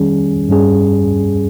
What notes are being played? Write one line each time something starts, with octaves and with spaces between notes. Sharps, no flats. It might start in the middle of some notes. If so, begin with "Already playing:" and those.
Already playing: D#3 G3 C#4 G#4
G2 G3 C#4 G#4